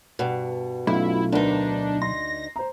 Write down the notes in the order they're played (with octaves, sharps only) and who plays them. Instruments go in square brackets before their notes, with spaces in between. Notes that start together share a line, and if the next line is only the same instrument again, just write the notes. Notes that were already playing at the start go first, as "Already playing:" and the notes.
[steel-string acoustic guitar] G2 B2
[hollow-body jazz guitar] B1 [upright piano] A3 C#4 F4 [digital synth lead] E4
[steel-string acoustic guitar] D2 D#4 [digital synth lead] D4 [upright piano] A#4 B4
[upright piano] C6 [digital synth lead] A#6
[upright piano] C5 A#5